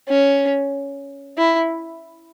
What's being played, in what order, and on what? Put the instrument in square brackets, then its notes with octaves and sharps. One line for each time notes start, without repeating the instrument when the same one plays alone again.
[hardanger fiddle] C#4
E4